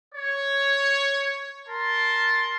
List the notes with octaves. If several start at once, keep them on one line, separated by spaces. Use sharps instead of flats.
C#5
A#4 A5 C6